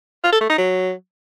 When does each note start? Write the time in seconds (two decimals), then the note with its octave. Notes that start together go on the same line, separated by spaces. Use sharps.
0.24 F4
0.33 A4
0.41 A3
0.49 D#4
0.58 F#3